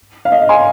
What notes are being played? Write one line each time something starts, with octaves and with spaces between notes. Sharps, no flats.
F5
D#5
G#5 C6